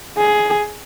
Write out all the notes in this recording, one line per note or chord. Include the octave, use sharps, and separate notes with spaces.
G#4